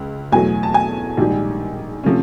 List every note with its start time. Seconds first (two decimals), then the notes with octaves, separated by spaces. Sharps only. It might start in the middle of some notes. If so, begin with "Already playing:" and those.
Already playing: C#2
0.32 E2 B2 F#3 A3 G#5
0.63 A5
0.74 G#5
1.17 A#1 G#2 D#3 G3
2.04 C3 F3 A3 C#4